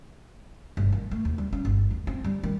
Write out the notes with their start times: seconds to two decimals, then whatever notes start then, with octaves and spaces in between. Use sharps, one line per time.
0.77 G1
0.92 D#3
1.11 A3
1.25 D#2
1.38 G3
1.53 C#4
1.65 G1
1.91 D#2
2.07 C4
2.24 G3
2.43 D#3